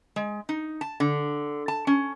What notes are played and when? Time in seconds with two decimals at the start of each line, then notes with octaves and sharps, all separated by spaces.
0.16 G#3
0.49 D#4
0.81 A5
1.00 D3
1.68 A5
1.87 C#4